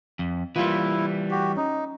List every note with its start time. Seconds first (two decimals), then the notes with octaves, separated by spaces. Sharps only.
0.19 F2
0.56 E3 G3 A#3 E4 F4
1.31 F#4 G4
1.57 C#4 D#4